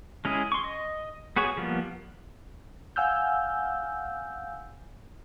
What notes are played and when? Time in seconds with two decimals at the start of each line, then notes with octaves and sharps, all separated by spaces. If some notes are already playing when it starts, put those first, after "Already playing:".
0.25 G#3 C#4 E4 G#4
0.52 C6 C#6
0.64 D#5
1.36 B3 F#4 G#4 C#5 C#6
1.57 F3 G3 A#3 B3
2.96 F5 F#5 G#5 E6 F6 G6